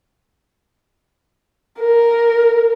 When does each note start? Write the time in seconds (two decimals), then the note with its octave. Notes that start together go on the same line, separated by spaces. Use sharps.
1.80 A#4